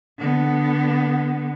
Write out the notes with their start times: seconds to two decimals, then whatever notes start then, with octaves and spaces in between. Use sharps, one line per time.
0.18 D3 B3